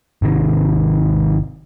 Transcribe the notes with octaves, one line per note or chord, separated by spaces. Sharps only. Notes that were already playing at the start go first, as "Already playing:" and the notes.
G#1 C3 D#3